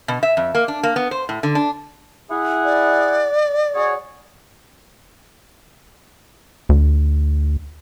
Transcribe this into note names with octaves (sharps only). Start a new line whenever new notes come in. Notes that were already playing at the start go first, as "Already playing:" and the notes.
B2
E5
F2
A#3
D4
A#3
B3
C5
A2
D3
D4
E4 G#4 F#5
D5
F#4 G#4 C#5
D2